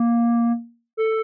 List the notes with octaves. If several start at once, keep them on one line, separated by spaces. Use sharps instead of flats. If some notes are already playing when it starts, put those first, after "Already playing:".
Already playing: A#3
A4